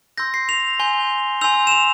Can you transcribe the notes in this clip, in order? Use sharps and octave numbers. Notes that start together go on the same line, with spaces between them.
C6 E6 G6 A#6
C7
F7
G#5 C6 G6 G7
G#5 C6 E6 G6 F7
E7
F7